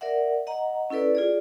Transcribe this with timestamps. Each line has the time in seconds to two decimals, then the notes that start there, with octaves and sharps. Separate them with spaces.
0.01 A#4 D5 E5 F#5
0.47 D#5 F#5 A#5
0.90 C#4 E4 A4 B4 D5
1.15 F4 G#4 D5